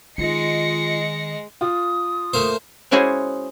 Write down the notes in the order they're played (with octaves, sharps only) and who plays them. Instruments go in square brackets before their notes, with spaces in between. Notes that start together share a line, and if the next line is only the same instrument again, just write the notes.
[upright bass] D#3 [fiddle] G#3 D#5 [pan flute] F4 [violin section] A#6 C7 C#7
[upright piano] F4 [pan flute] D#6
[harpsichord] A3 A#3 C5
[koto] G#3 C#4 E4 F#4 G#4 C5